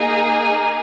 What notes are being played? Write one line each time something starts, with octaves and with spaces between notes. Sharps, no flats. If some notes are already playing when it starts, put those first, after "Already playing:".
Already playing: A#3 D#4 G#4